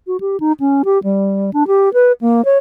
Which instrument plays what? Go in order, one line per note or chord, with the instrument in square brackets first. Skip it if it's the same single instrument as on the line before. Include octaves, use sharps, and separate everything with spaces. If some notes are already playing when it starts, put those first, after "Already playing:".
[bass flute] F#4
G4
D#4
C#4
G4
G3
D4
G4
B4
A#3
C#5